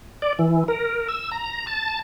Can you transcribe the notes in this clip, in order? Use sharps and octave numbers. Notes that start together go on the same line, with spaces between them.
D5
E3
A#4
E6
A#5
A5